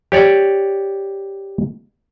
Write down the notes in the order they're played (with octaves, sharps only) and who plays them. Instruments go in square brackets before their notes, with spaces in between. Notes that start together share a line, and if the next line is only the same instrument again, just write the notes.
[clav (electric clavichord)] G4 C#5 D5